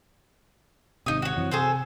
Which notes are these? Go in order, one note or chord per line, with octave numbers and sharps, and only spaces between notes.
G#1 C3 D#4 D#6
F#4 C#5
F#2 E3 C4
C3 G#4 A4 C5